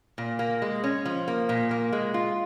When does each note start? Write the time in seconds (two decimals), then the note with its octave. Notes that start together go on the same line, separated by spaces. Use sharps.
0.18 A#2
0.39 A#3
0.62 G#3
0.84 C#4
1.05 F3
1.28 A#3
1.49 A#2
1.71 A#3
1.92 G#3
2.14 F4